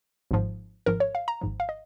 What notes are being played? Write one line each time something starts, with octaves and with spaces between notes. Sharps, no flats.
G#1 G#2 F3
G#1 G#2 F3 A#4
C#5
F5
A#5
G#1 G#2 F3
F5
D#5